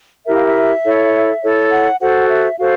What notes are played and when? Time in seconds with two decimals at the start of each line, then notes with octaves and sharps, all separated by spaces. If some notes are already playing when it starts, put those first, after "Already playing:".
0.26 E4 G4 A#4 E5
0.36 F5
0.45 E5
0.84 E4 A4 C#5
1.42 E4 A4 C#5
1.71 F#5
2.00 F#4 A4 C5 F#5
2.30 E5
2.59 F#4 A4 C5 F5